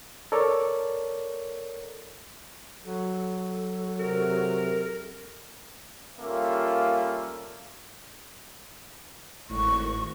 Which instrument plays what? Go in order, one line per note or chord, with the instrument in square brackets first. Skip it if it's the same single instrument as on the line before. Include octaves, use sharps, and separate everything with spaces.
[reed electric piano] A4 A#4 C#5 D5
[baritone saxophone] F#3 [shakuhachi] A4
[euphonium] C3 [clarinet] A#4
[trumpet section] G3 A#3 C#4 F4 A4 E5
[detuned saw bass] G#1 [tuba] A2 [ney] C#6